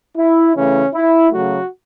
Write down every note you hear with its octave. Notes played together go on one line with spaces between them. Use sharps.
E4
C#3 E3 A3 C#4
E4
C#3 F#3 A3 F#4